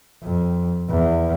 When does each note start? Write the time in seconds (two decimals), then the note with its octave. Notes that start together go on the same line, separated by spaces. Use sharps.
0.23 F2
0.90 E2